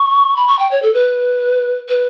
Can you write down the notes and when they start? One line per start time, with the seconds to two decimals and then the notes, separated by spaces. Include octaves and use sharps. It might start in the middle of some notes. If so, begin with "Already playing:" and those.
Already playing: C#6
0.36 B5
0.47 C#6
0.59 G5
0.71 C#5
0.82 A4
0.94 B4
1.88 B4